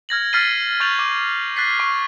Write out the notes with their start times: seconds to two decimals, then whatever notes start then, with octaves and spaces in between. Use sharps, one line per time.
0.09 F6 G#6 A#6 F#7
0.33 F6 A6 B6 C7 D#7 G7
0.80 C#6 G6 A6 B6 F7 F#7
0.99 D6
1.57 F#6 A6 B6 C7
1.80 C#6